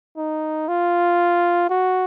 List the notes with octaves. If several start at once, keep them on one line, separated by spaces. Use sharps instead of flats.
D#4
F4
F#4